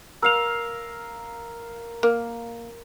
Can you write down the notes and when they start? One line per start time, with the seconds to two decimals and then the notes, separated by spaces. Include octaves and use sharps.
0.22 A#4 F5 E6 F7
2.03 A#3